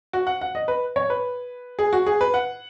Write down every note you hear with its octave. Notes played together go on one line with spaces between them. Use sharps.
F#4
F#5
F#5
D#5
B4
C#5
B4
G#4
F#4
G#4
B4
F#5